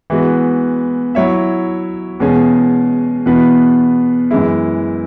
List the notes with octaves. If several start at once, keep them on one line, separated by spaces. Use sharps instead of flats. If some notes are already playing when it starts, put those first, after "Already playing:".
E3 G#3 B3 F#4
F#3 E4 C#5 E5
E2 B2 G#3 C#4 G#4
E2 B2 B3 F#4 B4
F#2 E3 G#3 E4